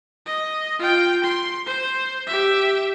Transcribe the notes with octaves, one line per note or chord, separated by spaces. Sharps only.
D#5
F4 G5
C6
C5
G4 E5